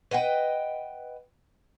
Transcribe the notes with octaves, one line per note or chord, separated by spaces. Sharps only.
B4 D#5 F#5 G5